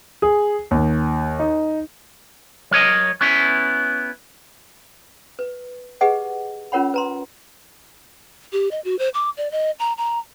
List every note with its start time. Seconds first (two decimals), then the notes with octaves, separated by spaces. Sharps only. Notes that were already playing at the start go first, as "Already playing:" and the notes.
0.22 G#4
0.71 D#2
1.39 D#4
2.71 F#3 A#4 C#5 D#5
3.21 B3 C#4 E4
5.39 B4
6.01 G4 G#4 B4 D#5 F#5
6.72 C#4 F4 A#4 C#5 F#5 B5
6.94 B4 A#5 C6
8.53 G4
8.71 D#5
8.85 F#4
8.99 C5
9.14 D6
9.37 D5
9.52 D#5
9.79 A#5
9.98 A#5